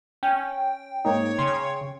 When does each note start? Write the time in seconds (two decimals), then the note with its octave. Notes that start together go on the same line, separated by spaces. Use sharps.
0.23 C#4 G5
1.05 G#2 A#3 D#4 C#5
1.39 C#3 C6